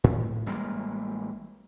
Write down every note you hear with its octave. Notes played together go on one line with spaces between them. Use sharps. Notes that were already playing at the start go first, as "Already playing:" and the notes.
A2
A1 G3 G#3 A#3